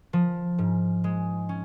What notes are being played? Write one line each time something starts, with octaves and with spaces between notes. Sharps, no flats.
F3
G#2
G#3
C#4